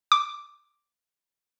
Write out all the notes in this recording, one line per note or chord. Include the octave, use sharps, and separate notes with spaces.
D6